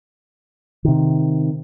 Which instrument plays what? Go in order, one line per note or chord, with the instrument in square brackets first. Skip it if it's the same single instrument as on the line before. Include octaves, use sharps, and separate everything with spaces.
[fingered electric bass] C3 D#3